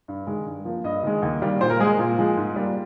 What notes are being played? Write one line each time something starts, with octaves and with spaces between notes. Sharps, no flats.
G2
D#3 G#3
G2
F3 A#3
G2 D#5
D#3 G#3
D#2
D#3 G3 A#3
A#2 C5
A#4
G#3 G#4
A#2
F3 G#3
G#2
G3 A#3